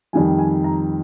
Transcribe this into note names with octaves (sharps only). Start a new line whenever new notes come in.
F2 D#3 G3 G#5
G#5
A#5